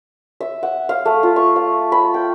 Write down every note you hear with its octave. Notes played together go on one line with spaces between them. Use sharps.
E5
F#5
F5
A3
F4
C#6
F5
B5
G5